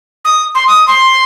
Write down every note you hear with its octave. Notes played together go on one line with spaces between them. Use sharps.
D#6
C6
D#6
C6